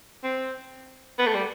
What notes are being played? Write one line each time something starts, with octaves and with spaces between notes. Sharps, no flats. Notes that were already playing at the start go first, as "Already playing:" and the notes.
C4
B3
A3
G3